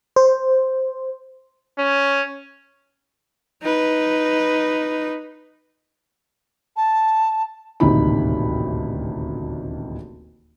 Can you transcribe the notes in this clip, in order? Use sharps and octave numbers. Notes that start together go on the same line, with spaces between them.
C5
C#4
D#4 B4
A5
D#1 A1 D2 C3 D#4 B5